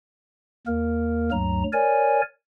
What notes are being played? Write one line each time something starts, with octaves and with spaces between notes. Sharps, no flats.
D#2 A#3 A#4
D2 G2 F#3 A#5
A#4 C#5 D5 G#5